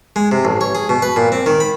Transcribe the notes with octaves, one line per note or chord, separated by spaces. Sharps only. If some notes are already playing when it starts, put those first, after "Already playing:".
G#3
C3
A1
C#5
G#4
B2
B4
A#2
C4
D#3
B5